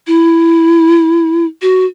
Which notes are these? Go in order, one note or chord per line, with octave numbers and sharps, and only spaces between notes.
E4
F#4